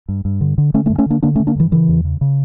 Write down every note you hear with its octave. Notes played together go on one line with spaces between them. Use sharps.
G2
G2
D3
D3
D3 A3 C#4
A3 C#4
G2
A3 C#4
D3 A#3 D4
D3 A#3 D4
A3 C#4
D3
A#3 D4
G2 E3
C#3 E3
E2
C#3
C#3